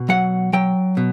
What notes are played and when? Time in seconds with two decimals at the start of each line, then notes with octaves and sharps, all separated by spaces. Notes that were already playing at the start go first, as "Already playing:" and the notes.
Already playing: B2
0.09 F#3 F#5
0.53 F#3 G5
0.97 B2